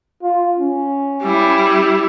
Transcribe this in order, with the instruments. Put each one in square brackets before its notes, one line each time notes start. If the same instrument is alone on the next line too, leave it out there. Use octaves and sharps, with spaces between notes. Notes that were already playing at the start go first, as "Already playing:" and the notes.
[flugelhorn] F4
C#4
[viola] G3 E4